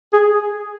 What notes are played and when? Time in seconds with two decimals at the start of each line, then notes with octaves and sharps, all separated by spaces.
0.13 G#4